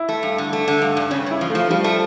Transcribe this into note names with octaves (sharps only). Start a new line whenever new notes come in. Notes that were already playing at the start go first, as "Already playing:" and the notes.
Already playing: E4
A3
G2
D3
A3
D3
G2
G2
C#3 C#4
C#3 E4
F3
A3
F3
F3 G3
A3